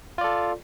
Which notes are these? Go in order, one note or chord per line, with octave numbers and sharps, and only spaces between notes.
F4 A4 D5